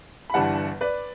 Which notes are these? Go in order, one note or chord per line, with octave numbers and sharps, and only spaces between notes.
B5
G1 G2 E3 G3 F#5 A5
B4 D5